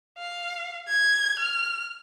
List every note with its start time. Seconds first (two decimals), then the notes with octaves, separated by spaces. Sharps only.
0.18 F5
0.88 G#6
1.39 F6